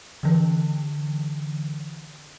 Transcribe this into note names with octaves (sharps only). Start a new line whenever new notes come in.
D3 E3